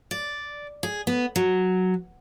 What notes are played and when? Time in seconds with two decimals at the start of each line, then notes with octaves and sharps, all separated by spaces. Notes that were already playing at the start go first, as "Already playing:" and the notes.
0.11 D5
0.83 G#4
1.07 B3
1.36 F#3